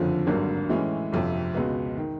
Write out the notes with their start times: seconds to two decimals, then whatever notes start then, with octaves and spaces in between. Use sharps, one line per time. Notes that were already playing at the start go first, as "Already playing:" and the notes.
Already playing: F#1 F2 D3 F3
0.27 G#1 G2 D3 F#3 A#3
0.69 A2 E3 G#3 C#4 E4
1.12 G1 F2 C3
1.54 C#2 B2 G#3 B3
1.97 D#3